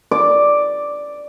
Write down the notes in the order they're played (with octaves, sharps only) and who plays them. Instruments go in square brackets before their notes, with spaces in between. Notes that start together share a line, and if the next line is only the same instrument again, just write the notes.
[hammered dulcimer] D5